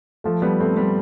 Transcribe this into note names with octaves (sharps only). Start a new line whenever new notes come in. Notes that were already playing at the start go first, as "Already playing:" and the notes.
F3 A3
G3 B3
A3 C4
G3 B3